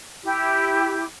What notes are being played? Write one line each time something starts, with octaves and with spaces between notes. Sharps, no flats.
E4 G4